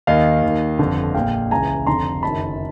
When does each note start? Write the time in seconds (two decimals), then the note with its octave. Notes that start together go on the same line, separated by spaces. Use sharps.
0.07 D#2 D#3 D#5 F5
0.43 D#2
0.48 D#3
0.79 G1 F2 D3
1.14 A#1 A#2 F5 G5
1.51 C#2 C#3 E3 G#5 A#5
1.86 F1 F2 D3 A#5 C6
2.23 F#1 F#2 D#3 A5 B5